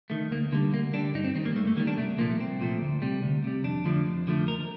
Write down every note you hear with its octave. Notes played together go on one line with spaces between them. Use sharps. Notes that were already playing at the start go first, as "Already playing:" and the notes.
D#3 A3
D2 A#3
D3 G3 A#3
D2 A#3
D3 G3 D4
G2 D#4
C4
D#3 C4
G3
A#3
G2 A3
A3
D#3 G3 A#3
D4
C2 A3
A#2 F3 A3 A#3
C2 C4
A#2 F3 A3
D2
C3 G3
D2
C3 G3
F2 D4
D3 F3 A3
F2
D3 F3 A3
D#2 A#4